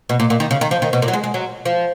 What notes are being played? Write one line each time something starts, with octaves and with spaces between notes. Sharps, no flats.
B2
A#2
A#2
D#3
C#3
D#3
F3
D#3
B2
A#2
F#3
G#3
G#3
F#3
F3